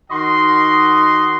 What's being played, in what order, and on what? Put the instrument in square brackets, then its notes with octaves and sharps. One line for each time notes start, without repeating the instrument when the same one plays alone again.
[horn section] D#3 F#4 D#5 F#5 C6